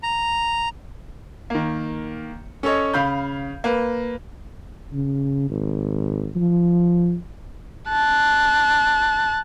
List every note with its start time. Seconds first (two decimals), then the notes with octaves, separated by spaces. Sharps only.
0.03 A#5
1.50 D#3 A#3
2.63 C#4 A4 C#5 D#5
2.93 C#3 F5 B5 G6
3.64 A#3 B4
4.93 C#3
5.50 G#1
6.36 F3
7.89 A5 F#6